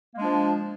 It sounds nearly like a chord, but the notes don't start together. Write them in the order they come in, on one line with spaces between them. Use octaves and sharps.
A#3 G#3 D4 F3